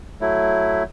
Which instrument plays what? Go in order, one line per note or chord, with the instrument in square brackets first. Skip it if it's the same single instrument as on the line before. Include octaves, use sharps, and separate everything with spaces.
[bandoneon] F#3 A3 E4